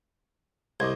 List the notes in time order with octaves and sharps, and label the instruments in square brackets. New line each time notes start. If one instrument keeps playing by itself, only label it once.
[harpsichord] C2 [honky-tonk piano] C5 D#5 D6 [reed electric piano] G#6